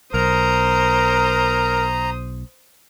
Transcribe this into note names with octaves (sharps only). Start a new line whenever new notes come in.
B1 A#4 C5 A#5 D#6